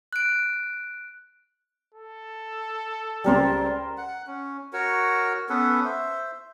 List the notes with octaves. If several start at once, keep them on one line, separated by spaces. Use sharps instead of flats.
F#6 D7
A4
C#2 G3 G4 A#4 C5 D5
F#5
C#4
F#4 A#4 C#5
B3 C#4 A4 B4
C5 E5